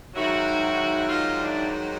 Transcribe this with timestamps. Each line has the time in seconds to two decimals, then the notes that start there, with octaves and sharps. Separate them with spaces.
0.15 G#2 D#3 F#3 E4 F#4
1.08 D#4 F4
1.40 D4 E4